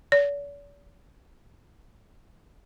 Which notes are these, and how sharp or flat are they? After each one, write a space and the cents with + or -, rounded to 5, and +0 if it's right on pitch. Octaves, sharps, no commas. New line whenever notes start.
D5 -45